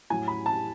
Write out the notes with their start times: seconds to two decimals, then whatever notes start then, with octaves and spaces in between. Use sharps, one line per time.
0.10 A2 F#3 G#5
0.28 B5
0.46 A5